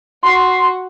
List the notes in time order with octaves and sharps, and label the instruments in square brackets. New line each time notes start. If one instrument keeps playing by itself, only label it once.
[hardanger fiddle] F#4 [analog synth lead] C6